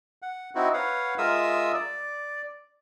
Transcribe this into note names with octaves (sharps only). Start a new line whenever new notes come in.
F#5
C4 D#4 E4 F#4
B4 C#5 F5 F#5
G#3 F4 A#4 E5 D#6 E6
D5